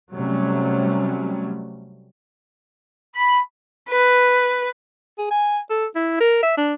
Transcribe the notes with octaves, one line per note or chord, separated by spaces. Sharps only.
C3 F#3 G3 A3 C#4
B5
B4
G#4
G#5
A4
E4
A#4
E5
D4